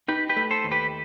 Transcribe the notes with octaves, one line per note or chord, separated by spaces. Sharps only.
D#4 G4 B4
G4 B4
A3
A4 C5
D#2
G4 B4